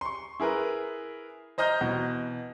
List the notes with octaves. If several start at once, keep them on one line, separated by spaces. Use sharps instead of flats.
C6 C#6
E4 G#4 A#4 B4
C5 D#5 A#5 F6 G6
B2 E3